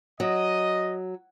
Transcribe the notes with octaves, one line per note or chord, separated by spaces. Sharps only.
F#3 D#5